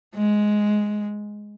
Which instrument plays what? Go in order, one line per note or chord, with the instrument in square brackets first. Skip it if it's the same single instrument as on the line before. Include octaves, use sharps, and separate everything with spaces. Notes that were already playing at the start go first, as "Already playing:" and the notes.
[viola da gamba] G#3